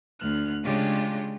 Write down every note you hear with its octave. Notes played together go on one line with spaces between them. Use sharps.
D2 F6 F#6
C#3 G#3 C#4 D4 F4 G4